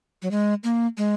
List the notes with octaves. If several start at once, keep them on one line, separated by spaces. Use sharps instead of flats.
F#3
G#3
A#3
G#3